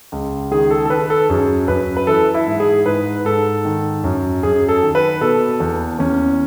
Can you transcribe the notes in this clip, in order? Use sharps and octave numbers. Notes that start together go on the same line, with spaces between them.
C#2
D#3 G#4
A4
A4
D#3 B4
A4
F#2 G#4
F#2 B4
B4
E3 A4
E4
G#2
G#4
G#2 B4
G#2 A4
D#3
F#2
F#2 G#4
A4
D#3
B4
B2 A4
E2
E2 C#4